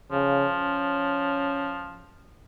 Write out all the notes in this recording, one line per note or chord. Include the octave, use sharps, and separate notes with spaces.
C#3 F3
C#4